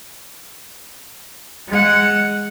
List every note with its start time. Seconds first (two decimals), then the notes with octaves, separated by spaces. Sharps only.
1.68 G#3 F#5